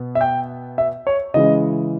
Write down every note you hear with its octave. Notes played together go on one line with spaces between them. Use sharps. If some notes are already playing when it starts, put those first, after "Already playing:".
Already playing: B2 B3
E5
G5
E5
C#5
C#3 E3 G#3 D#5